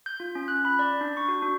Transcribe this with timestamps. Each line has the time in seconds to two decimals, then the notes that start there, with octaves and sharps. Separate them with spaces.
0.06 G6
0.20 F4
0.35 C#4
0.48 F#6
0.65 B5
0.79 D5
1.01 D4
1.17 C#6
1.28 F#4
1.42 D4